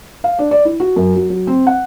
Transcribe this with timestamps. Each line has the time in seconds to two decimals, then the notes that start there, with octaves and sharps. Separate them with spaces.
0.24 F5
0.39 D4
0.51 D5
0.65 E4
0.80 F#4
0.96 F#2
1.16 F#3
1.30 F#3
1.47 C4
1.67 F#5